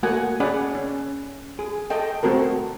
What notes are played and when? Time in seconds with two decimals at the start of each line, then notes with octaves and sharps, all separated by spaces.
0.03 A3 A#3 F#4 F#5 G#5
0.40 C#4 G#4 D5 F#5 B5
0.75 C#4
1.59 G#4
1.90 A4 D#5 G5
2.23 A3 C4 F#4 A4 A#4